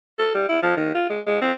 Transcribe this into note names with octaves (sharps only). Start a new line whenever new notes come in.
A4
G3
E4
F3
D#3
F4
G#3
G#3
C4